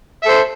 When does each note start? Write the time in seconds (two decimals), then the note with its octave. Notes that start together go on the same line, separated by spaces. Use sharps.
0.23 E5
0.26 A4
0.28 C5